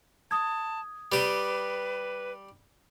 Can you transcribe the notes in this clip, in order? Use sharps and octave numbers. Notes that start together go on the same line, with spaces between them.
A5 D#6 G#6
G3 G4 B4